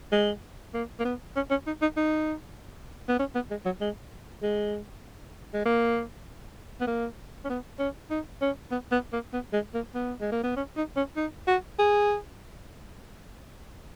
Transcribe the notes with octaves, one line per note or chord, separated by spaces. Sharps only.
G#3
A#3
A#3
B3
C#4
C#4
D#4
D#4
D#4
B3
C#4
B3
G#3
F#3
G#3
G#3
G#3
A#3
B3
A#3
C#4
B3
C#4
D#4
C#4
B3
B3
A#3
B3
G#3
A#3
B3
G#3
A#3
B3
C#4
D#4
C#4
D#4
F#4
G#4